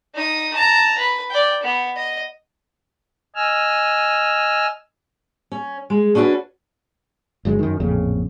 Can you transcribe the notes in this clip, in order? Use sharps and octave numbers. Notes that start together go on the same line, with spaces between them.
D#4 D#6
A5 A#5
B4
D5 G5
B3
D#5
D#5 G#5 E6 F6
C#4
G#3
C#4 D4 F#4 G4 B4
G1 F#3 G#3
F#2 D#3
A1 F2 A#2 C#3